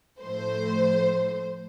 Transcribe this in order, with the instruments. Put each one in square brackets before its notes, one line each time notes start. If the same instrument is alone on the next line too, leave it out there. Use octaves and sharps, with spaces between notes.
[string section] A2 F3 A3 C5